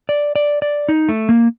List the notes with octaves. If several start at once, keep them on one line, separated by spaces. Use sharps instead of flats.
D5
D5
D5
D#4
A3
A#3